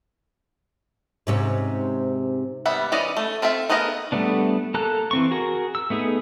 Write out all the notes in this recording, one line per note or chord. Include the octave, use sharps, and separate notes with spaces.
G#2 C3 C#4
G3 B3 E5 B5
E3 C#4 D5 D#5
A3
C4 F4 A4 E5
A3 B3 G#4 A#4 D#5
G3 A3 B3 D4
A#3 A4 A5 A#5 F#6
E3 C4 C#6
F#4 G#4 A#4
E6
A3 B3 D#4 G#4